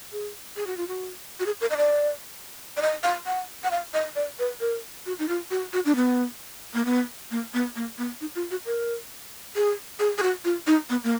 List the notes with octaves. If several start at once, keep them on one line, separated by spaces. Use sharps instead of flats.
G#4
G#4
F#4
F4
F#4
F#4
G#4
A#4
D#5
D5
D5
D#5
F5
F#5
F#5
F5
D#5
D5
B4
A#4
F#4
D#4
F4
F#4
F#4
D4
B3
A#3
B3
A#3
B3
A#3
B3
D#4
F4
F#4
A#4
G#4
G#4
G#4
F#4
F4
D#4
B3
A#3